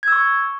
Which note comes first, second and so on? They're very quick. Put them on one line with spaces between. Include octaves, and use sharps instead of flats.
G#6 E6 C#6